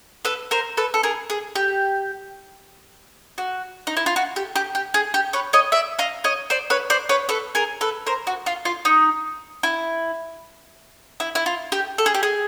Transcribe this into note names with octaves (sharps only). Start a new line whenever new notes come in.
A4 B4
A#4 C5
A4 B4
A4
G#4 A#4
G#4
G4
F#4
D#4
E4
F4
F#4
G4
G4
G4
G#4
G4
B4 C#5
C#5 D#5
D5 E5
D#5 F5
C#5 D#5
C5 D5
B4 C#5
C5 D5
B4 C#5
A4 B4
G#4 A#4
A4 B4
A#4 C5
F#4
F4
F4
D#4
E4
E4
E4
F4
G4
A4
G#4
G4
G#4